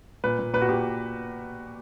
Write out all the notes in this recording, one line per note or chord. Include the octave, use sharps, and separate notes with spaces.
A#2 B4
A#2
A#2 B4
F#4
A#2 G4